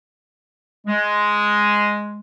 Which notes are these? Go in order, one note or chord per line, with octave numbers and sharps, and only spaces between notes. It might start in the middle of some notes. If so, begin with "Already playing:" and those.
G#3